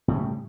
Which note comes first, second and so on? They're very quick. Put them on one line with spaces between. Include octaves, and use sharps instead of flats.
A2 C#3 E3 G3